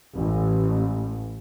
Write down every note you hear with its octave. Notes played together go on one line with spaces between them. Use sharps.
A1